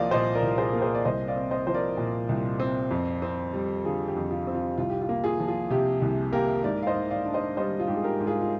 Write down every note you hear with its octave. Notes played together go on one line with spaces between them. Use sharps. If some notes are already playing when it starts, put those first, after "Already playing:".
Already playing: C2 F3 A#3 A#4 C5 D5 D#5 F5
A#2 C5 D#5
A#4 D5
C2
G#4 C5
A#3 A#4
G#4 C5
D5
C2 C5 D#5
D5 F5
C4
C5 D#5
F3 C5
A#4 D5
A#2
C2
C4
F2
C4
G3
D3 F4 G#4
G4
F2
F4
C4
F4
C2 F4
G4
F4
A#3
F4 G#4
F3
F4
C3 G4
C2
A#3 G4 A#4
G#2 A#4 D5
F5
C5 D#5
G#2
D5 F5
D4
C5 D#5
G3 C5 D#5
F4
G#2 G4
G#4
G4 A#4
G#2
F4 G#4
F4